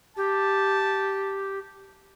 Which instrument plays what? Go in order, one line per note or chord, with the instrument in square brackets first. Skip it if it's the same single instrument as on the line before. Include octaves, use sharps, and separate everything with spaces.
[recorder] G4 [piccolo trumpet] A5